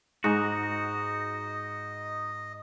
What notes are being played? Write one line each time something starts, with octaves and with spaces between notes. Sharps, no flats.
G#2 D#4 F#4 D#5